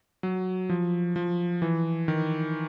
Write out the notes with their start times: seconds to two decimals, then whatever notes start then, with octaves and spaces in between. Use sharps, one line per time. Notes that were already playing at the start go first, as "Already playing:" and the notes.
0.23 F#3
0.69 F3
1.16 F3
1.62 E3
2.08 D#3